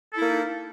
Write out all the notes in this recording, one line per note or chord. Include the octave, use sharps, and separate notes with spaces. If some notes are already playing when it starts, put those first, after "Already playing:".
A#3 D#4 E4 A4